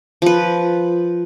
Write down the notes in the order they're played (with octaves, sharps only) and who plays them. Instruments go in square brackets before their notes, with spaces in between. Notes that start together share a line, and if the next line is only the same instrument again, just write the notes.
[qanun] F3 B4